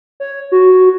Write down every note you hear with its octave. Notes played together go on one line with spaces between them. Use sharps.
C#5
F#4